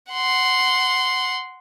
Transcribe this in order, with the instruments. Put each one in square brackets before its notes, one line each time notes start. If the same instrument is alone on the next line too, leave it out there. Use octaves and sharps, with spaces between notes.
[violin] F#5 C6